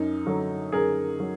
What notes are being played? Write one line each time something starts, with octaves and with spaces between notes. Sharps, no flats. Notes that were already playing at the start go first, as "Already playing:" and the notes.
Already playing: F#2 D#4
D3 F#3
F#2 G#4 A#4
F#3